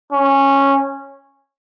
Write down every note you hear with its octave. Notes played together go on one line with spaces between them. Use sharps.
C#4